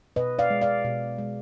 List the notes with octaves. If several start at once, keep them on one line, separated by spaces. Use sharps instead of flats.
B2 B4 D#5
D5 F5
G#3
D5 F5
B2
G#3